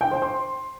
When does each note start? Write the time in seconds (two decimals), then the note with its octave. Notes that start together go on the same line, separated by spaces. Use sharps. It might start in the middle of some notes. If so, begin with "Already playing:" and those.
0.01 G5
0.11 C5
0.22 C6